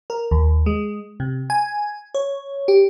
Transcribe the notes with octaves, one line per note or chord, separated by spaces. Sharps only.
A#4
D#2
G#3
C3
G#5
C#5
G4